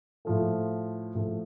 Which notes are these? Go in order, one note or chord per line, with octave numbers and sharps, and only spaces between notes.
A2 F3 A3
A2 F3 A3